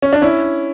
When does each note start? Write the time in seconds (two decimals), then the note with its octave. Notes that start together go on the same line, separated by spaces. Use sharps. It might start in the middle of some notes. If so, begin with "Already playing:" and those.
0.02 C#4
0.13 D4
0.22 C#4 E4